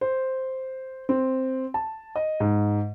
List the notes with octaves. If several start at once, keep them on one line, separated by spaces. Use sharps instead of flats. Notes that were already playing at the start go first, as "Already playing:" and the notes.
C5
C4
A5
D#5
G#2